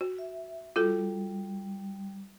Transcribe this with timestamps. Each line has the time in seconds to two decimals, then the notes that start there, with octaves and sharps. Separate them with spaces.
0.01 F#4
0.19 E5
0.76 G3 F4 F#4 A4